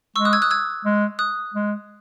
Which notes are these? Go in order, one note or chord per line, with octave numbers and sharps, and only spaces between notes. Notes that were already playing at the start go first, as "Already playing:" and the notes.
G#3 C#6 E6
D#6 F#6
E6 G#6
D#6 F#6
E6 G#6
G#3
D#6 F#6
G#3